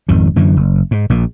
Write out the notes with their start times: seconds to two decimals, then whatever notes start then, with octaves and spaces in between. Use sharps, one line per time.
0.09 G#1 F2 D#3
0.36 F#2 D3 E3
0.57 F#1
0.91 G#2
1.10 A#1 A#2